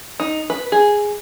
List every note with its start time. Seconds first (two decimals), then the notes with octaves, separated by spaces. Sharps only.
0.20 D#4
0.50 B4
0.72 G#4